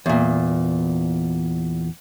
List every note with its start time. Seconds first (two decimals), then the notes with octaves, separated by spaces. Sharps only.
0.06 E2 A#2